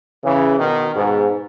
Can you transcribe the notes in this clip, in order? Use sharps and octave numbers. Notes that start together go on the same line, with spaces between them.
C#3 E3
B2 D#3
G#2 B2